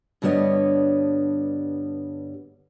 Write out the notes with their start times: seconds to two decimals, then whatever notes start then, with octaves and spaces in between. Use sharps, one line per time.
0.22 G2 D3 G3 B3 C#5 D#5